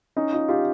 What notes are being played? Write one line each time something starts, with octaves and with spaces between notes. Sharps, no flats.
C#4 D#4
D#4 F4
F4 G4